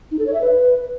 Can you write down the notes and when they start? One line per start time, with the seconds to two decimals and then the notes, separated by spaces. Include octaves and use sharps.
0.11 D#4
0.19 A4
0.26 C#5
0.34 E5
0.41 B4